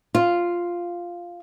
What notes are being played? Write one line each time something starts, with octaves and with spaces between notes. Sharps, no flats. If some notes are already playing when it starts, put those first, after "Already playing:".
F4